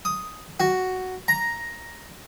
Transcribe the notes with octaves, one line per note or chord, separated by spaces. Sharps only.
D#6
F#4
A#5